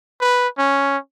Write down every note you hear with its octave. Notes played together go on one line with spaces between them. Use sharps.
B4
C#4